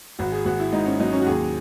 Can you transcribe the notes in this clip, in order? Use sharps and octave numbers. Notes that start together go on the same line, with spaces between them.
G#1 F#4
G#4
G#1 F#4
E4
G#2 D#4
C#4
F#3 D#4
C#4
F#4
D#2 G#4